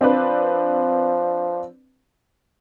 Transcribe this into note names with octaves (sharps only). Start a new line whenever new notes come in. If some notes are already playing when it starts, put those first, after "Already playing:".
F3 C4 D4 B4